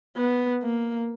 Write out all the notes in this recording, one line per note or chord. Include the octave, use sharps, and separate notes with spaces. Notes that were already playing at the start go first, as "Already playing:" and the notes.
B3
A#3